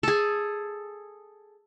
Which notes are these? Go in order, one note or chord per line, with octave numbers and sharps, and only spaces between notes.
G#4 A4